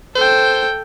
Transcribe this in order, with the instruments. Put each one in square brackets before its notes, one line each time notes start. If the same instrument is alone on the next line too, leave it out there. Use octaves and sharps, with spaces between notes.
[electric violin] A4 G5 [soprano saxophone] C5